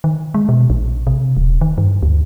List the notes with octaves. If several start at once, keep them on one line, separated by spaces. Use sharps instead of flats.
D#3
G#3
B2
A#1
C3
D#1
D#3
G2
D2